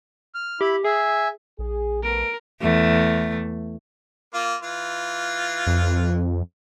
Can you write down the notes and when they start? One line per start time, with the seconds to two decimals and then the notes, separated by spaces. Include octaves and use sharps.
0.35 F6
0.61 E4 G4 B5
0.84 G#4 E5 G#5
1.59 A#1 G#4
2.03 A3 B3 A#4 D7
2.61 E2 A3
4.34 A#3 F4
4.63 E3 F4
5.66 F2